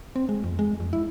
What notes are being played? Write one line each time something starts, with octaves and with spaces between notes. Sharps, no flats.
C4
G#3
F2
G#3
F2
E4